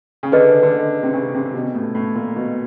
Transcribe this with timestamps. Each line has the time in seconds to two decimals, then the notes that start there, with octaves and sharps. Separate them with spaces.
0.23 C#3
0.32 D3 G#4 B4 D#5
0.63 D3
1.03 C3
1.13 C#3
1.34 C3
1.54 B2
1.74 A2
1.95 A2
2.15 A#2
2.36 B2